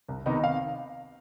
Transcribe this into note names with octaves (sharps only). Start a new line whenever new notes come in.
C2
C3 D#3 B3 D#4
F5